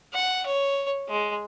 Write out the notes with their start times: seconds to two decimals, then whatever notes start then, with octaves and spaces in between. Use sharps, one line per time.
0.13 F#5
0.46 C#5
1.08 G#3